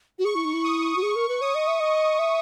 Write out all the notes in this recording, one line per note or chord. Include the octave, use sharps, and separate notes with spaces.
F#4
G#4 C#6
E4
D#4
E4
D#6
F#4
G#4 C#6
A#4
B4
C#5 D#6
D#5
E5
D#5
E5